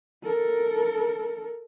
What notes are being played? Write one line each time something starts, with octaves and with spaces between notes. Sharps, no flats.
A4 A#4